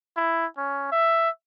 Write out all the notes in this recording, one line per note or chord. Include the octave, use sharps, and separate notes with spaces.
E4
C#4
E5